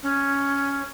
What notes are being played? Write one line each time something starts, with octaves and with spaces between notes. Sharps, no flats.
C#4